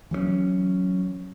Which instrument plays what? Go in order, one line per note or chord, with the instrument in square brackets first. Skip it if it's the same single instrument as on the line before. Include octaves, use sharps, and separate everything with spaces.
[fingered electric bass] E3 F#3 A3 C#4